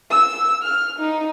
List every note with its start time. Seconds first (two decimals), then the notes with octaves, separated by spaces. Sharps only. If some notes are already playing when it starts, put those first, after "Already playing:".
0.11 E6
0.62 F6
0.99 D#4